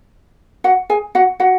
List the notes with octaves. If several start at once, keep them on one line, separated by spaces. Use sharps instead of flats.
F#4 F#5
G#4 G#5
F#4 F#5
F#4 F#5